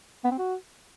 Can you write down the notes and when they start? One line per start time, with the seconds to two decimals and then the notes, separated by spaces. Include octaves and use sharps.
0.24 B3
0.31 C4
0.38 F#4